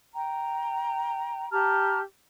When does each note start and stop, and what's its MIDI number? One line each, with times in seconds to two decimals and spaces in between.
0.14 1.47 79
0.14 1.47 82
1.50 1.99 67
1.50 1.99 81
1.50 1.99 82
1.50 1.99 89